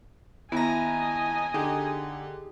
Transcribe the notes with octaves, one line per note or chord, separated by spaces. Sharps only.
D#2 B3 E4 D#5 G#5 A#5 A#6
D3 D#4 G4 G#4